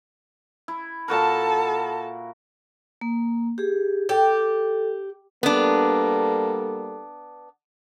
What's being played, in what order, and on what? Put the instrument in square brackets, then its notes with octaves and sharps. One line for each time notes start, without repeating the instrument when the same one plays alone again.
[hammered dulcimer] E4
[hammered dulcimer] A#2 F#4 A#4 [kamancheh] A4 A5
[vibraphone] A#3
G4 G#4
[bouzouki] G4 [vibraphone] A4
[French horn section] G3 A#3 A4 [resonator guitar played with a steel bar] B3 D4